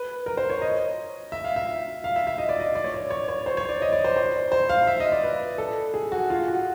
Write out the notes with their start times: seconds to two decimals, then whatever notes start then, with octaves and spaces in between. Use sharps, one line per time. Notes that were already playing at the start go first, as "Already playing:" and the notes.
Already playing: B4
0.26 A#4
0.37 C5
0.50 C#5
0.62 D#5
1.32 E5
1.44 F5
1.56 E5
2.04 F5
2.16 E5
2.27 E5
2.38 D#5
2.49 D5
2.60 D#5
2.75 D5
2.84 C#5
2.94 D5
3.10 C#5
3.29 C#5
3.46 C5
3.57 C#5
3.69 D5
3.82 D#5
3.92 D5
4.04 C5
4.16 C5
4.52 C5
4.69 F5
4.87 E5
5.00 D#5
5.12 D5
5.23 B4
5.58 A4
5.94 G#4
6.12 F#4
6.30 F4
6.48 F#4